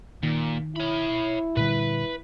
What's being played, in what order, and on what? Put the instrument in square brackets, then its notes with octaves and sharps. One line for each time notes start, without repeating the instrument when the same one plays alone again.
[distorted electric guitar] A#2 [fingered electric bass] D#3
[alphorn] E4 [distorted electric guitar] C#5 B5
[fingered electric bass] A#2 D3 G3 [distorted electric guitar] B4